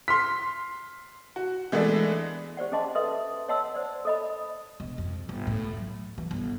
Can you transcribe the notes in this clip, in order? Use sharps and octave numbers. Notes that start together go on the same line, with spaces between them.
C6 F6 B6
F#4
E3 G#3 A3 B3 D4 E4
G4 C5 D5 F#5
C#4 G#4 D#5 A5 C6
A4 B4 D#5 E5 C6
C#5 D#5 F#5 A5 C6 E6
C5 D5
A4 D#5 B5
E1
F2
G1
A2
F#3
E3
G1